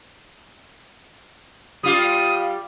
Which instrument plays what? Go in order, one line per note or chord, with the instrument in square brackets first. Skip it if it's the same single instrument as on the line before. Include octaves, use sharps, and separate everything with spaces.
[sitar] G3 F4 G4 [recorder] D#6